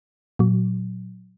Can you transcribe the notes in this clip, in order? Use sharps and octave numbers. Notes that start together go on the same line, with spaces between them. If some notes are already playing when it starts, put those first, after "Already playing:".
A#2 F#3